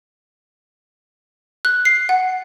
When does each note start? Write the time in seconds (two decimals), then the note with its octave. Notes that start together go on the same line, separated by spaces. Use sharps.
1.65 F#6
1.85 C7
2.09 F#5